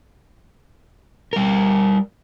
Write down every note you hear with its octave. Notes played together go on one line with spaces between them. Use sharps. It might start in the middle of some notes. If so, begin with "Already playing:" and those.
G3 A#4